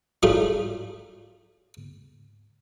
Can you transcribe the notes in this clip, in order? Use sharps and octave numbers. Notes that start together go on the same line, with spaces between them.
A2 F#3 G3 A3 F4 G#4